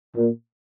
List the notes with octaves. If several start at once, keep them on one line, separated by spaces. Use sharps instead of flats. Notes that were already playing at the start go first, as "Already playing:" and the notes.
A#2